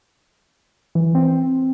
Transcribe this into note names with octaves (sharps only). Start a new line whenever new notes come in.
E3
C4